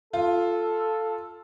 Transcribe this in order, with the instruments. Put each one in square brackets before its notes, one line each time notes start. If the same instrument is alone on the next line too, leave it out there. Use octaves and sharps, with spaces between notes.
[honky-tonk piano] F4 [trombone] A4